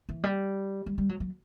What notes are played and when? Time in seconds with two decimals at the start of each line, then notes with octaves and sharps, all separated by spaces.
0.09 E3
0.24 G3
0.86 G3
0.98 G3
1.09 F#3
1.20 F#3